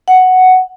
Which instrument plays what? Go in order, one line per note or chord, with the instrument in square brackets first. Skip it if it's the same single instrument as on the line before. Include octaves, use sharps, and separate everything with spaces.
[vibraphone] F#5